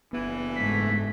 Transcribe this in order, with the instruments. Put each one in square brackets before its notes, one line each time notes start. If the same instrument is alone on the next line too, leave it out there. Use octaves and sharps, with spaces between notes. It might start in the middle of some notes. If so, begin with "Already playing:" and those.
[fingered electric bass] F#1 B3 [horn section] G2 C#3 E3
[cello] G#2 A3 [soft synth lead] B6